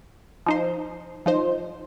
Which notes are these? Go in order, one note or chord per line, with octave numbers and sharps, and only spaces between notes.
F3 D#4 C5
F3 D#4 C5